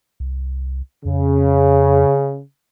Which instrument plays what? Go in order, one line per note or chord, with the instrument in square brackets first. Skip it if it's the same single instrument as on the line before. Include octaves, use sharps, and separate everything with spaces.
[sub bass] C2
[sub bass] F2 [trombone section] C#3